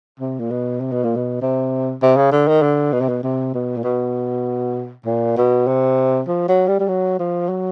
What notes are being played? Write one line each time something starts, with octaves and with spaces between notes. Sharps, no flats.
C3
A#2
B2
C3
B2
A#2
B2
C3
C3
C#3
D3
D#3
D3
B2
C3
B2
C3
B2
A#2
B2
A#2
B2
C3
F3
F#3
G3
G3
F#3
F3
F#3